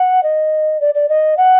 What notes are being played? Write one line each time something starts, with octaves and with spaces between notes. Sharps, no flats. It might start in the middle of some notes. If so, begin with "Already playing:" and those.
Already playing: F#5
D#5
D5
D5
D#5
F#5